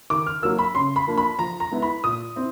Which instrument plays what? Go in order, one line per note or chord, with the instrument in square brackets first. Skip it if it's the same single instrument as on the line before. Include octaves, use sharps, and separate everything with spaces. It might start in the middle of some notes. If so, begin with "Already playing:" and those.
[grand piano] D#3 D6
F6
F#3 A#3 E6
B5
C#3 C6
B5
F3 A#3 D4
B5
F3 A#5
A#5
G#3 B3 E4
B5
A#2 D#6
C4 E4